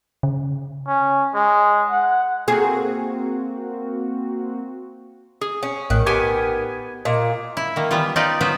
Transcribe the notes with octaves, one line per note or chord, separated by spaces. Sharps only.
C#3
C#4
G#3
F#5
A#3 C4 F#4 G#4
G#4
C#4
A#1 A2 D#3 F#6
B3 G4 G#5 G#6
A#2 D#5
E4
D#3 A#3
E3 G3 B3 F4
D#4 F4 G4 B4 D5
F#3 B3 F4 B4 C5